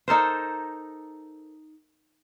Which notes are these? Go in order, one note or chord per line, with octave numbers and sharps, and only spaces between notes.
D#4 A4 A#4 C5